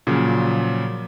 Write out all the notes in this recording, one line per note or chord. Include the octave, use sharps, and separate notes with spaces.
A#2 C#3 F3 F#3